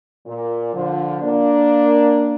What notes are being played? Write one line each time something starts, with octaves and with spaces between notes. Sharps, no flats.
A#2
D3 F3
A#3 D4